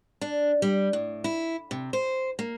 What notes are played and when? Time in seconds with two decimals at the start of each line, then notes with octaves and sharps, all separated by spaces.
0.21 D4
0.62 G3
0.93 A2
1.24 E4
1.71 C3
1.93 C5
2.39 A#3